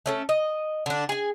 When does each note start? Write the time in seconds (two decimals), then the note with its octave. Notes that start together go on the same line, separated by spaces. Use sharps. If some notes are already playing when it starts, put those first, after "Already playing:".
0.06 A3 C#4 A4
0.29 D#5
0.86 D3 D4
1.09 G#4 G#5